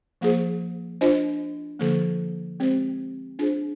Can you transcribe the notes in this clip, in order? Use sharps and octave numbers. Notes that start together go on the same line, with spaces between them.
F3 A#3 F4 G#4 C5
D4 F4 C5 D#5
D3 F3 A#3
G#3 C4 G4 C5
D4 F4 G#4 C5